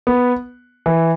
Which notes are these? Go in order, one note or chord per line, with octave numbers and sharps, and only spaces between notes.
B3
E3